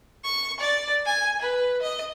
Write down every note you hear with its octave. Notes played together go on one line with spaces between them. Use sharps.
C#6
D5
G#5
B4
D#5